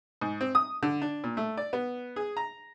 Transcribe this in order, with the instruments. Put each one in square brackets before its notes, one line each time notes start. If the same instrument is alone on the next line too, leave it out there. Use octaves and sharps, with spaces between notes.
[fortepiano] G#2
C4
D#6
D3
D4
A#2
A3
D5
B3
G#4
A#5